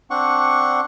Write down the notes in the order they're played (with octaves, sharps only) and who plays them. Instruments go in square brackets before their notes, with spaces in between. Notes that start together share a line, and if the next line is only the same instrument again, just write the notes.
[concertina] C4 D4 F#5 C#6